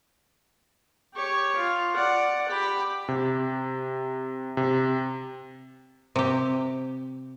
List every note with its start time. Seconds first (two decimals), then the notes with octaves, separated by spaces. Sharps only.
1.14 G4 C#5
1.57 F4
1.94 D5 F#5
2.48 G4 B5
3.08 C3
4.57 C3
6.16 C3 G4